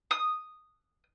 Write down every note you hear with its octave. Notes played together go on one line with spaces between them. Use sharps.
D#6